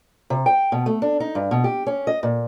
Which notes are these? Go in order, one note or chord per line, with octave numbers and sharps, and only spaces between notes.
C3
G5
B2
A3
D4
D#4
G2
B2
G4
C#4
D#5
A#2